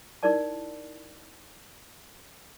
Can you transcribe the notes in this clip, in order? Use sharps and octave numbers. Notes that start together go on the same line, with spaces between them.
D#4 E4 A#4 D5 A5